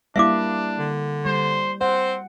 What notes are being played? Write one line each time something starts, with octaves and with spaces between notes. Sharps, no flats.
G3 A#3 D4 E4 E5 F5 D6
D3
G3 C5
C4 C5 F#5